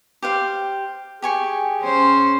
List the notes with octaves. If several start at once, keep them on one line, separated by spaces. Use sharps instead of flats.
G4 C5 F5
G4 G#4 G#5 C#6
C#4 C5